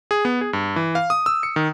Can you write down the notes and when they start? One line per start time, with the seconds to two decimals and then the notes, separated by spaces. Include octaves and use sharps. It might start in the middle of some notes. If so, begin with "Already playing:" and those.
0.11 G#4
0.25 B3
0.41 G#4
0.53 G2
0.76 E3
0.95 F5
1.10 D#6
1.26 E6
1.43 C#7
1.56 D#3